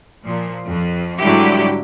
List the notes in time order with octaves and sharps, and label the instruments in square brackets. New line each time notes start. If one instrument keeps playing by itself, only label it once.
[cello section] A#2 F3
F2
G#2 D3 F#3 G3 E4 G4